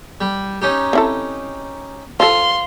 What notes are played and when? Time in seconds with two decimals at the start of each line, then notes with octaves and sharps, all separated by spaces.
0.21 G3
0.62 C#4 D#4 G4
0.93 C4 E4 A4
2.20 F3 F4 A4 C6